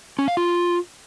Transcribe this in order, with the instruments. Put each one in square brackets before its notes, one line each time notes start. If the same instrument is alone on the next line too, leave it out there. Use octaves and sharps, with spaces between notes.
[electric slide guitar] C#4
F5
F4